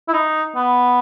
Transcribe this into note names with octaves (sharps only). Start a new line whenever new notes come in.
E4
D#4
B3